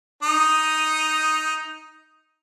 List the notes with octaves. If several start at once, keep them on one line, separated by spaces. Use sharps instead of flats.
D#4 D#6